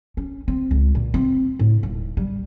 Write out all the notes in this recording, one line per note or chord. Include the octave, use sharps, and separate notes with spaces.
C#4
C4
C#2
A#2
C4
A2
D#1
G3